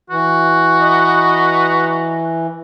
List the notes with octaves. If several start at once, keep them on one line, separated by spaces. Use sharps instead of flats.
E3 F#4
B4 D#5 A#5